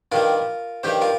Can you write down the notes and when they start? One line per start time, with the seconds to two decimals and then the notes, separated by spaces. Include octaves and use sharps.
0.12 G2 D#3 G3 F4 A#4
0.83 G2 D#3 G3 G4 C5
1.01 F4 A#4